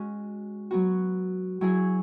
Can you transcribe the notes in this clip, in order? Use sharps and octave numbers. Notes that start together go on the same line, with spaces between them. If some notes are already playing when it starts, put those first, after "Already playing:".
Already playing: G#3 C#4 F#4
F#3 B3 F#4
F#3 E4 G#4